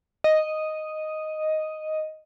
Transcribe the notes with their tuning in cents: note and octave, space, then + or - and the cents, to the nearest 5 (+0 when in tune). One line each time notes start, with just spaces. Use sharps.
D#5 +0